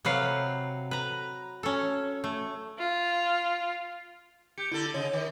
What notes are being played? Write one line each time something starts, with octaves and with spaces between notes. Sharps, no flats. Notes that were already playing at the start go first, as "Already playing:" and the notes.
C3 F#3 B4 F5
B4 A#5
C#4 A4
A3
F4
G4 G6 C#7
D3 E4 A4
C#3 D#4 C#5
D#3